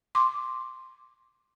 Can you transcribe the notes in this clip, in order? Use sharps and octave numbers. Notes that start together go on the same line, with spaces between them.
C6 D6